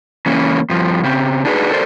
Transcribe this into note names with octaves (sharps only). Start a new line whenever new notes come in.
C#3 E3 A#3 C#4
G2 F3
C#3 C4
D4 D#4 F#4 G#4 A#4 B4
A4 A#4 C5 D5